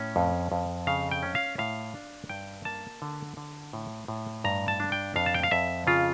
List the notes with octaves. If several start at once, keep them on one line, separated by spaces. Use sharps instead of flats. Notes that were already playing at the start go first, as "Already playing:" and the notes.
Already playing: A2 C#4
F2
F2
C#3 F5
G5
C#4
F5
A2 F5
D4
G2 G5
A#3 A5
D3
D3
A2
A2
G2 A#5
A5
D4
G5
F2 F5
A5
G5
F5
F2 E5
C#3 F4